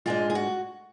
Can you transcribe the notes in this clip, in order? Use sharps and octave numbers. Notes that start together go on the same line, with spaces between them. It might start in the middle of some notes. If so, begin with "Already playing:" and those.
G#2 G#3 D4 F4 G#4
G#4
F#4